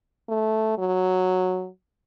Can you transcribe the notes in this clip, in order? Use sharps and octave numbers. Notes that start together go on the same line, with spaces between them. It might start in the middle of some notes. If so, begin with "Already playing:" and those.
A3
F#3